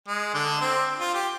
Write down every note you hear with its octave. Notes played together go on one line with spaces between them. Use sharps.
G#3
D3 D4
C4
F4
G4